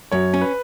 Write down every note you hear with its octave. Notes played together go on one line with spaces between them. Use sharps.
F#2 C#5
C#4
B4